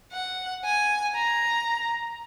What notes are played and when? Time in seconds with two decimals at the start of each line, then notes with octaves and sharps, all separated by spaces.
0.12 F#5
0.64 G#5
1.15 A#5